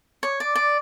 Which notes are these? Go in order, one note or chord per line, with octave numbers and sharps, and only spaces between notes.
C#5
D5
D5